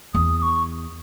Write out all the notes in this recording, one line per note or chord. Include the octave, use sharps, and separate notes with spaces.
E2 D#6
D#6
C#6